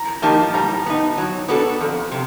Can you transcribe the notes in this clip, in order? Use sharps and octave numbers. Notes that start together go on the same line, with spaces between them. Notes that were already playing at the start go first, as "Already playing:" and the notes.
Already playing: A#5
F3 A#3 D#4 G4 A5
G3 A#5
B3 D#4
F#3
B3 D4 F#4 A4
F2
C3